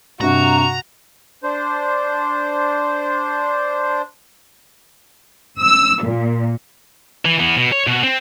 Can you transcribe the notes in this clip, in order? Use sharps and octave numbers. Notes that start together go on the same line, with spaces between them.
G2 C3 F#4 A#5
D4 C5
E6
A#2
E3
E3 B3
B2
C#5
B2 F#4
C4